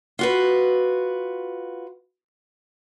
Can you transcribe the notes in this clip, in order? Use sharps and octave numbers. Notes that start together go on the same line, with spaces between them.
F4 F#4 B4